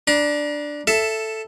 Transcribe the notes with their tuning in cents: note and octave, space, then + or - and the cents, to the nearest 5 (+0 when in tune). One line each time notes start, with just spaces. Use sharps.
D4 +0 A#5 +40
A4 +0 E5 +10